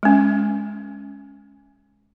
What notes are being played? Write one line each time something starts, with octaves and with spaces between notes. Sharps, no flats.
G#3 C#4